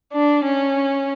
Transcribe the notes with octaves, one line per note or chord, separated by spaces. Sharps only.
D4
C#4